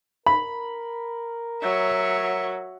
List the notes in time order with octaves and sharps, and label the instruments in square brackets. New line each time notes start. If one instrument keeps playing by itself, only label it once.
[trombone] A#4 [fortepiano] B5
[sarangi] F#3 [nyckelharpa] C#5 E5